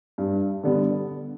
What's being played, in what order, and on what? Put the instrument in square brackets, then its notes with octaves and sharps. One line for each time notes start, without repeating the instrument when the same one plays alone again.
[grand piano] G2
D3 G3 B3